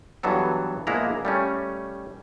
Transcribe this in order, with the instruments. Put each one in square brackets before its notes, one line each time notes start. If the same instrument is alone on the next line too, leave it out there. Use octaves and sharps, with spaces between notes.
[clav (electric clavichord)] G2 E3 F#3 B3 A4
A#1 G#3 A#3 B3 E4 A#5
G3 A3 C#4